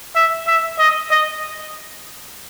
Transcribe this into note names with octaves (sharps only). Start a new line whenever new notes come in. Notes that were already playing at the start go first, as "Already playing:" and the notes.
E5
E5
D#5
D#5